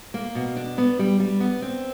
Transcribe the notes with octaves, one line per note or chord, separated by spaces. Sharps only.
A#3
B2
D4
B3
G3
G3
B3
C4